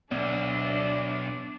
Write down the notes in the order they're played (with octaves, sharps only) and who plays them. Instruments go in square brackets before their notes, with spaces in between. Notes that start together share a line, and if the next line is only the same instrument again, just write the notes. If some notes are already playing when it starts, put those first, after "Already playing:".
[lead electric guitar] B1 [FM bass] B3 [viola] D4 [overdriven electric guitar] D5 E5